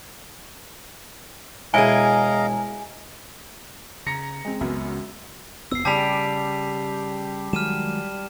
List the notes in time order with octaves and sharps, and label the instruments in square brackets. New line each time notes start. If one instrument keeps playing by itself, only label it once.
[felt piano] E1 D7 [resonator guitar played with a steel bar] E4 G#4 [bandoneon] D#5 F5 A#5 [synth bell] G#5
[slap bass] C#3 [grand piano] A#5 A#6 C#7
[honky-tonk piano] G#3 C4
[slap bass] C#2 [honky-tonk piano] F#2 B3
[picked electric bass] F1 F2 B3 [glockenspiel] E6 C7
[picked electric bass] C#3 [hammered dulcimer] G3 G4 [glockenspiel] A5 B6 F7
[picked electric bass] D#3 F#3 G#3 [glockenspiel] F6 D#7 E7